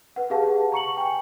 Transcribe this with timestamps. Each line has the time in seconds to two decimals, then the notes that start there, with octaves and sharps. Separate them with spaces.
0.16 B4 F#5
0.30 G4 G#4 B4 F5 F#5 A5
0.72 A#5 C#6 C#7 F#7
0.97 G5 G#5